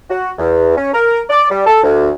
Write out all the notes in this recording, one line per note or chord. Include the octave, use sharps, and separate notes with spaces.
F#4
E2
C#4
A#4
D5
G3
A4
D2